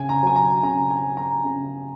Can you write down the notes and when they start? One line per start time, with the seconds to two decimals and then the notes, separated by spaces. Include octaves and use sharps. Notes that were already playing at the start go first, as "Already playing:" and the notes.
Already playing: C#3 G#5
0.09 A#5
0.23 F#3 G#5
0.36 A#5
0.63 C#3 A#5
0.91 G#5
1.04 F#3
1.17 A#5
1.44 C#3